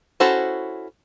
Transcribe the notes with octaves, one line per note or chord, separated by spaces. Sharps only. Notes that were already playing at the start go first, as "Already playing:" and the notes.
C#4 E4 F#4 A4 C5